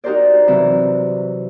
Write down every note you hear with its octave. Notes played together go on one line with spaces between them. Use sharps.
D#4 F#4 G4 A#4 C5 D5
C3 E3 F#3